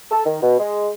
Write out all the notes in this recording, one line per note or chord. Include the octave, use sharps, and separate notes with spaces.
A4
D#3
B2
G#3